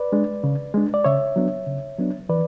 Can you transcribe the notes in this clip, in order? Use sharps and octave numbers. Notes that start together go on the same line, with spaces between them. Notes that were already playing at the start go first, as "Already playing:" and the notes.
Already playing: B4 D5
G#3 D4
C#3
G#3 D4
D5
C#3 C#5 E5
F#3 B3 D4
C#3
F#3 B3 D4
E3 B4 D5